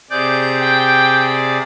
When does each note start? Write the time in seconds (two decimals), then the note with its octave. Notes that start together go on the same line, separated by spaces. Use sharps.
0.10 C3 G#4 D5 G6
0.60 G5